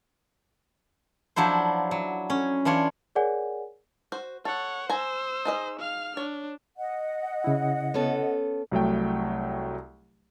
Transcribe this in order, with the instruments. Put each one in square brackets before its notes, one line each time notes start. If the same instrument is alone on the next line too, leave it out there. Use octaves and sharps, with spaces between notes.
[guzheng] F3 F#3 D4 E4 C5
F#3
C#4
E3 D4 F4 C#5
[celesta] G#4 A#4 C#5 D5 F#5 G#5
[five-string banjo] F#4 C5
[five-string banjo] A4 [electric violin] C#5 F#5
[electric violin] C5 E6 [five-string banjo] G#5 A#5
[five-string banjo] D#4 G#4 D#5
[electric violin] F5 F6
[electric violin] D4 [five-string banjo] C#5
[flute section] D#5 F#5
[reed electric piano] C#3 E4
[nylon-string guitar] B3 C#4 A4
[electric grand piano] C2 F#3 A3 G5